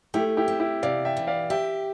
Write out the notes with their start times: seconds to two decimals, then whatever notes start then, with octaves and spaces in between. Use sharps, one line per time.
0.14 A3 E4 G4
0.37 E4 G4
0.48 C4
0.60 E4 G4
0.83 C3 D5 F5
1.05 E5 G5
1.17 E3
1.27 D5 F5
1.50 G4 E5 G5